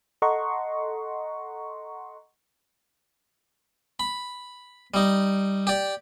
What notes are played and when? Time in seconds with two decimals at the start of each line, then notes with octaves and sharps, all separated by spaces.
0.22 A4 D#5 F#5 A#5 C6 C#6
4.00 B5
4.94 G3 D#4
5.67 G4 D5